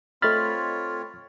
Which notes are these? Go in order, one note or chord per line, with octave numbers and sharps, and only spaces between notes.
A3 C4 F4 C#5 D#5 B5 F6 A6